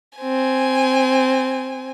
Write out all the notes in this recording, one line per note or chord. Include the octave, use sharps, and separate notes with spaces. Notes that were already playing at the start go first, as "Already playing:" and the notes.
C4 G#5